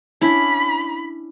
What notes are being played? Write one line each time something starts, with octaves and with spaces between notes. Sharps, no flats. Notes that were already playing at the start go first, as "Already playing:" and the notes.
C#4 D4 E4 B5